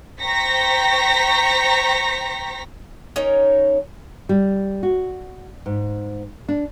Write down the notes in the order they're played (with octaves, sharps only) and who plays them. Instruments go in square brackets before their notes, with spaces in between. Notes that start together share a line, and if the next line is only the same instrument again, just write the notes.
[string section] C5 G5 A#5 C#6 A#6 B6
[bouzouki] C#4 D#4 A#4 C#5
[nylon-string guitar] G3
F#4
G#2
D4